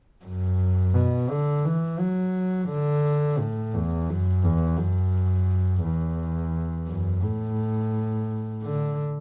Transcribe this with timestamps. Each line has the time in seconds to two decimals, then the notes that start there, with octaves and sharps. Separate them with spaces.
0.25 F#2
0.94 B2
1.29 D3
1.65 E3
1.99 F#3
2.69 D3
3.39 A2
3.74 E2
4.09 F#2
4.44 E2
4.78 F#2
5.84 E2
6.88 F#2
7.23 A2
8.63 D3